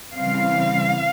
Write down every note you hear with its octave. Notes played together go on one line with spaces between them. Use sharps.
C#3 E3 G3 C4 F5